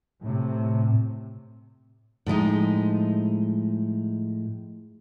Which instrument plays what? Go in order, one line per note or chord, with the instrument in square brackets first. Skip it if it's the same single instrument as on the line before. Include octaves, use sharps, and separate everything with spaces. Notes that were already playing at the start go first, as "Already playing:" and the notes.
[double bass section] A2 C3
[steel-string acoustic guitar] A2 F3 G#3 D#4